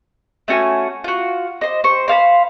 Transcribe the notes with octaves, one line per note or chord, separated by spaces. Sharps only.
A3 C#4 F#4 G#5
F4 F#4
C5 D#5
C5 C#6
C5 F5 A5 B5